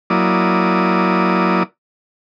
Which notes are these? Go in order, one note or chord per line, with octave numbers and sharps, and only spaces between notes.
F#3 A#3 E4 D5 D#6